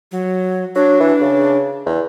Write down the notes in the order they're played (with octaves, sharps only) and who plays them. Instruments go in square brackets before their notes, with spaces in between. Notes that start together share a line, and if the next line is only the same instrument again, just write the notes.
[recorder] F#3
[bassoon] F#3 [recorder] D4
[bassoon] E3
C#3
E2